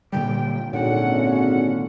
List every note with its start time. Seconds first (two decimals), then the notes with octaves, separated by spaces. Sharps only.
0.12 A#2 D3 G3 G5
0.73 G#1 A#2 D3 C#4 F#5